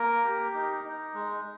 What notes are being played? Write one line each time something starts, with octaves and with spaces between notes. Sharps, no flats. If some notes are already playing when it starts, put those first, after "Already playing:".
Already playing: A#3 A#4
G4
D#4
D#4
G#3